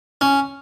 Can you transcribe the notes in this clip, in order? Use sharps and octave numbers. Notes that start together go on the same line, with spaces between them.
C#4